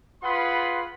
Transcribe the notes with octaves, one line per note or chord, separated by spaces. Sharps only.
F4 G#4 B4 F#5 B5 C6